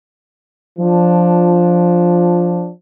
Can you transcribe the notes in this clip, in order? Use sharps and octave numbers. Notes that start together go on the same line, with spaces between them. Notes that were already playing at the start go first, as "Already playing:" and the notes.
F3 D4